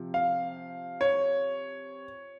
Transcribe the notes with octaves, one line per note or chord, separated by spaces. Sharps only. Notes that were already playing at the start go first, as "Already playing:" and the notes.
Already playing: C3 F3
F5
C#5